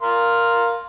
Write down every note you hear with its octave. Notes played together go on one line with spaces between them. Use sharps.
A#4 F5 C6